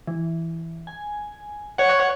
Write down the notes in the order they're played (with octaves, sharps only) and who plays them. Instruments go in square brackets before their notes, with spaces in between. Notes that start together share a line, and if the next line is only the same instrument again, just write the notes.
[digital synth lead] E3
G#5
[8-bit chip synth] C#5 F#5